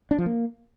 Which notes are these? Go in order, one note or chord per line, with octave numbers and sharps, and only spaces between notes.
D4
F3
A#3